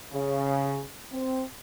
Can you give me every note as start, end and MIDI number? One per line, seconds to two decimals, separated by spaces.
0.13 0.82 49
1.13 1.42 60